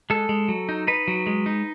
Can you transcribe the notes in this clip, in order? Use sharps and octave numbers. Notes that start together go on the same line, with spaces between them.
G#3 A4
G#3
F#3
D#4
D#4 B4
F#3
G#3
D#4